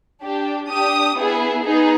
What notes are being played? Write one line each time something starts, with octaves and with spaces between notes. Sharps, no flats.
D4 G4
D4 G4 D#6
B3 E4 G#4
B3 D#4 G#4